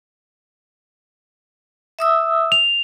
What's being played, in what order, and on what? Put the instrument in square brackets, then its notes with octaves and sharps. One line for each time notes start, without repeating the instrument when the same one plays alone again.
[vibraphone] E5 D#6 E6
[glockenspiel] F7